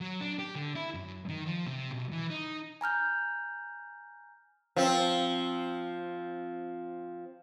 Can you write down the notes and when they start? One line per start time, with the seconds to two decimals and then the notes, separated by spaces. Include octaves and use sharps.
0.01 F#3
0.21 D4
0.39 G4
0.55 D3
0.76 E4
0.94 F#2
1.29 D#3
1.47 F3
1.66 C3
1.91 B1
2.12 E3
2.30 D#4
2.81 G#5 A#5 F6 G6
4.76 F3 C4